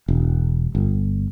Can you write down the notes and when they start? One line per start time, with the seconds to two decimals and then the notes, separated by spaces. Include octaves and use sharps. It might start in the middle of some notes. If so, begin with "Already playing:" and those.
0.08 E1
0.75 G1